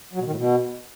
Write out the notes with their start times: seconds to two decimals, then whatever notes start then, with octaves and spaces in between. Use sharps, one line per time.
0.13 F#3
0.19 B2
0.25 D#3
0.31 A2
0.37 B2